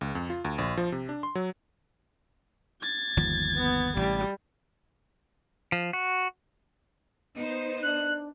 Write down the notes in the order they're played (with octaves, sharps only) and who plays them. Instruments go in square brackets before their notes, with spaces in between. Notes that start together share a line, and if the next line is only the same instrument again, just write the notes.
[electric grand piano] C#2
F2
F4
D2
A#1
F3
C3
D4
C6
F#3
[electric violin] G#6 A6
[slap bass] G1 D#2 F3
[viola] B3
[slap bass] A1 C3 [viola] G3
[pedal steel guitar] F3
F#4
[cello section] B3 D#4 C5
[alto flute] D4 [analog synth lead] F#6